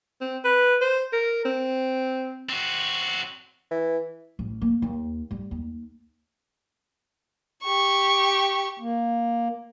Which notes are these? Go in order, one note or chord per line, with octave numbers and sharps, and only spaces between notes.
C4
B4
C5
A#4
C4
C4 F#4
E3
A1
A#3
D#2
G3
D#2
G4 C#6
A#3